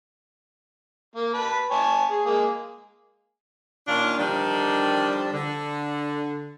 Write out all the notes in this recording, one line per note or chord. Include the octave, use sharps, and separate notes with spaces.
A#3
B4 A5 B5
C#5 G#5 A5
G#4
G#3 A#3 G#4
A#2 D#3 C#4 D4 F4 F5
D3 D#3 F3 G3 D4
D3